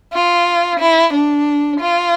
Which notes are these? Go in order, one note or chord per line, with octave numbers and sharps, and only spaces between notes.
F4
E4
D4
F4